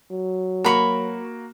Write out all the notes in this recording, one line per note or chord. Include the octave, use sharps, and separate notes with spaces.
F#3
A#3 F#4 A#5 B5 C#6